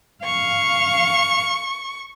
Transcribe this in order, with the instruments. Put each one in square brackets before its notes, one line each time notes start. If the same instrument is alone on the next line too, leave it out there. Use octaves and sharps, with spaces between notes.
[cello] F5 [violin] C#6